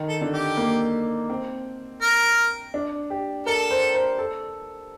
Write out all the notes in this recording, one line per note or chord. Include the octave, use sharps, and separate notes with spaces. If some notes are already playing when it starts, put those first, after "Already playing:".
Already playing: D#3
A4
D3
G4
A#3
C4
A#4
D4
G4
A4 A#4
C5
C5
A4